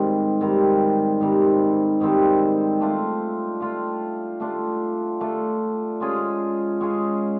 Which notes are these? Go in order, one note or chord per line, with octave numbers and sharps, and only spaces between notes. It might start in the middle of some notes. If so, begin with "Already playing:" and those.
Already playing: G#2 D#3 G3 C4
G#2 D#3 G3 C4
G#2 D#3 G3 C4
G#2 D#3 G3 C4
A3 D4 F4
A3 D4 F4
A3 D4 F4
A3 D4 F4
G#3 C#4 F4 G#4
G#3 C#4 F4 G#4